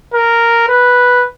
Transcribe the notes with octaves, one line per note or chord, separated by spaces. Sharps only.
A#4
B4